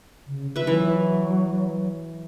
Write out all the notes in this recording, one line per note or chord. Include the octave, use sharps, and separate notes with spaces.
C#3
F4 B4 E5
E3 F#3